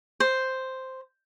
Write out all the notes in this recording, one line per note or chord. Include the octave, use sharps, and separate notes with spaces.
C5